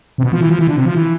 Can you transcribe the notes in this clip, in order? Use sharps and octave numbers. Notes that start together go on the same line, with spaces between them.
C3
B2
F3
E3
F3
E3
D3
C3
F3
E3